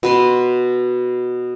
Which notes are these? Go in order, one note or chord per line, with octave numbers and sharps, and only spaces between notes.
B2 B4 C6